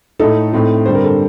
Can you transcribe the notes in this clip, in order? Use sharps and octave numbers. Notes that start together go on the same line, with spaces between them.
A2 A3 D#4 A4
A2 A3 C4 D#4
G2 D3 G3 C4 C5
A#4
A4